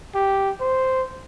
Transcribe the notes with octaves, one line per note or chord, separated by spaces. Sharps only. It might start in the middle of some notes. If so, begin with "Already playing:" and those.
G4
C5